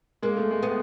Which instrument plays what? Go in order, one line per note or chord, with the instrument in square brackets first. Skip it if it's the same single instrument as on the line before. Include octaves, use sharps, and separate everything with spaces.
[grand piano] G#3 [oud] A#3
[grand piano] A3
G#3
[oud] B3